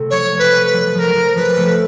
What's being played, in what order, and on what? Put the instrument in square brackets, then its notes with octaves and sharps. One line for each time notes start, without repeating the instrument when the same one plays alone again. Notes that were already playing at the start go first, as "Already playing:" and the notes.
Already playing: [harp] C3 A3
[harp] F3 [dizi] C#5
[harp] A3
[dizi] B4
[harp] A3
[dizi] B4
[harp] F3
[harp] F3 [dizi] A#4 B4
[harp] F3
[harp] F3 [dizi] B4
[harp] A3